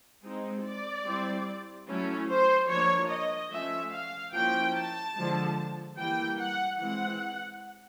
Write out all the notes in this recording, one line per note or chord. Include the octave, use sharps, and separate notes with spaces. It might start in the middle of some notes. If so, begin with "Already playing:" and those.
G#3 C4 D#4
D5
G3 C4 E4
F#3 A3 C#4 E4
C5
F3 A#3 D4 C#5
D#5
F3 A3 C#4 E5
F5
F3 A#3 C#4 E4 G5
A5
D3 F3 G#3
E3 G3 A#3 G5
F#5
E3 G#3 C4 F#5